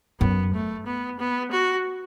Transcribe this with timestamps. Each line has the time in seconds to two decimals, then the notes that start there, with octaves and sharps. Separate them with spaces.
0.20 F#2 B3
0.53 A3
0.86 B3
1.20 B3
1.51 F#4